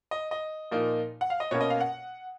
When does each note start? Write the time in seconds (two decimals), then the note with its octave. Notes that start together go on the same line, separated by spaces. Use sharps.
0.11 D#5
0.31 D#5
0.71 A#2 F3 A#3 D#4
1.21 F#5
1.30 F5
1.40 D#5
1.51 B2 A#3 C#4 C#5
1.61 D#5
1.70 F5
1.80 F#5